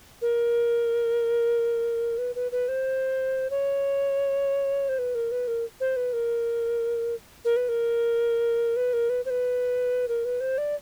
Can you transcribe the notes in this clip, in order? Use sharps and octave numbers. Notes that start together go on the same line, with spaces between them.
A#4
B4
B4
B4
C5
C#5
C5
B4
A#4
B4
A#4
C5
B4
A#4
A#4
B4
A#4
B4
A#4
B4
C5
B4
A#4
B4
C5
D5